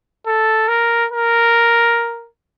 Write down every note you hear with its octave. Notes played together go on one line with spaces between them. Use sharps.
A4
A#4
A#4